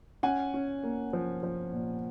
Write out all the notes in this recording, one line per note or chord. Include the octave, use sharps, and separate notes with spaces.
C#4 F#5 G#5
C#4
A#3
F3
F3
A#2